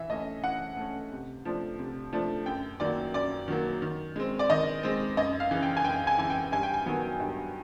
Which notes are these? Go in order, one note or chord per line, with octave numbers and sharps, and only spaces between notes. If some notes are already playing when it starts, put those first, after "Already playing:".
Already playing: E3 E5
A3 C#4 D#5
E3 F#5
A3 C#4
C3
F3 A3 D4
C3
F3 A3 D4
F#2 G5
D#3 F#3 A#3 D5
F#2 D5
D#3 F#3 A#3
D#3
G#3 C4
D5
D#3 D#5
G#3 C4
F#2 D#5
F5
C#3 E3
G5
G#5
F#2 G5
G#5
C#3 E3 G#5
G5
G2 G#5
G5
G#5
D#3 F#3 B3
G2